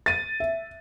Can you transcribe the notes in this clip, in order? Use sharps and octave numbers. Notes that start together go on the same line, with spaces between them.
A6 D#7
E5